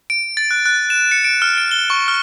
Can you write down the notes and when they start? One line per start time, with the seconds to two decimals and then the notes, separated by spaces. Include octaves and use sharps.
0.10 D7
0.37 A6
0.51 F#6
0.66 F#6
0.90 E7
1.12 C#7
1.24 D7
1.42 F6
1.58 D7
1.71 G7
1.90 C#6
2.08 F6